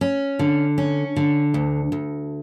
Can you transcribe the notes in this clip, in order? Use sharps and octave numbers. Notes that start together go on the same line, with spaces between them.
C#4
D3
C#4
D3
D2
D2